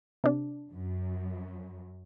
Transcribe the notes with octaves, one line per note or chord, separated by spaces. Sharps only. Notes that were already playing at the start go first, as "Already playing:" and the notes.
C3 D4
F#2